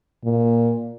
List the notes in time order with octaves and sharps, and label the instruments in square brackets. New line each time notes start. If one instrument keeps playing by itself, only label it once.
[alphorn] A#2